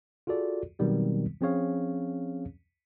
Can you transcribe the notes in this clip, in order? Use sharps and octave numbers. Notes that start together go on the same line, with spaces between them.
F4 F#4 G#4 A4 D5
B2 D#3 F#3 G3 B3 C4
F3 C4 C#4 G#4 C#5 F5